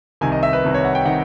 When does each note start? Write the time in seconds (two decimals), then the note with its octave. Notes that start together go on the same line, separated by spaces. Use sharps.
0.21 C2 C3 D#3 G#5
0.32 D#5
0.43 E5
0.53 B4
0.64 C2 C3 D#3
0.74 C#5
0.85 F#5
0.95 G5
1.06 C3 D#3 F#5